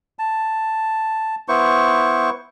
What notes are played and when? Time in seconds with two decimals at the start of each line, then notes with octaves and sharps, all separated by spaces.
0.19 A5
1.48 B3 E4 C5 C#6